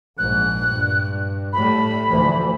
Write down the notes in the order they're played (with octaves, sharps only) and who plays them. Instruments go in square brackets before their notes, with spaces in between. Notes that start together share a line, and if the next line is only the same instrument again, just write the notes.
[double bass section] A#1 G#2 [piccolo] F#6
[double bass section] G2
[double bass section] A2 G3 A3 [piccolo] B5
[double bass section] D2 E3 F3